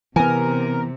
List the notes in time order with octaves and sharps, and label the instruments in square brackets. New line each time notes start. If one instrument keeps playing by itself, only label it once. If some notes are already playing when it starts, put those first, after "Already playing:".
[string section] C3 [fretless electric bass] E3 B3 [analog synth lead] A#4 [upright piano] G#5